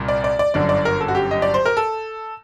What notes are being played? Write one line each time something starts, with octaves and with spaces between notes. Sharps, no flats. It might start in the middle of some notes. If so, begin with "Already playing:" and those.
Already playing: C2 A#2
D5
D5
D5
G1 F#2 D3 D5
D5
A#4
A4
F#4
G4
D#5
D5
C5
A#4
A4